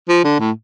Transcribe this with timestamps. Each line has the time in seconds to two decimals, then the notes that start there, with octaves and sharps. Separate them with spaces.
0.09 F3
0.24 D3
0.39 A2